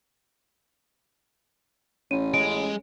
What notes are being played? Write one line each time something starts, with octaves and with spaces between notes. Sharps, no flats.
A1 C#4 C#5 D#7
G#3 D7